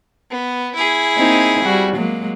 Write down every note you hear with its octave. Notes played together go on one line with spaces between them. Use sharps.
B3
E4 G#4
A#3 C4 D#4
G3 F#4
F#3 G#3 A#3